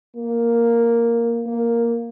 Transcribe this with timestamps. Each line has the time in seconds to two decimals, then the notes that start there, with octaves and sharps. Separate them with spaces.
0.16 A#3
1.47 A#3